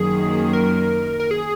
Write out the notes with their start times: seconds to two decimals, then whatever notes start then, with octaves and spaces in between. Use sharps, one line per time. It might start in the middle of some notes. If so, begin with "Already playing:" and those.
Already playing: F#2 D#3 F#3 A#3 G#4
0.53 A#4
1.20 A#4
1.31 G#4